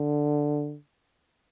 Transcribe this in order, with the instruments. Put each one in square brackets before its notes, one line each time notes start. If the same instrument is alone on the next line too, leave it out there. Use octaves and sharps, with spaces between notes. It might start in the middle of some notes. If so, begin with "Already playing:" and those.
Already playing: [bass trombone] D3